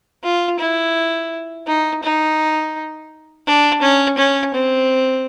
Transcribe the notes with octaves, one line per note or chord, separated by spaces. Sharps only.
F4
E4
D#4
D#4
D4
C#4
C#4
C4